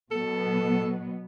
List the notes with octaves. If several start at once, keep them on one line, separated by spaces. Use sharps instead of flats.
B2 F#3 B3 A4